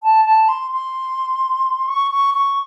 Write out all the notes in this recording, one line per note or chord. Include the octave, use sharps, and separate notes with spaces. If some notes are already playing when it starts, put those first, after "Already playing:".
A5
A5
C6
C6
C#6
C#6
C#6